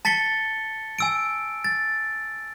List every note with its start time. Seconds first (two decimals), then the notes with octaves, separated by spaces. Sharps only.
0.05 A5 A6 B6 C#7 G7
0.99 G#5 E6 D7
1.64 A6